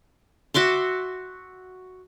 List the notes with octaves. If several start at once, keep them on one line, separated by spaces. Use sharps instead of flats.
F#4 E5 C6 D6